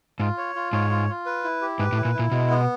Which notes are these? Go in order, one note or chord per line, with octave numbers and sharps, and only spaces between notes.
G#2 F4
C#5
F4
G#2 C#5
F4
F4
B4
E4
G4
G#2 B4
A2
E4
A#2
E4
A#2
B2 G#3
B3